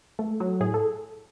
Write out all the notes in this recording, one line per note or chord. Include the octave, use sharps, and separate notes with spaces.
A3 A4
F#3
A2 G#4
A4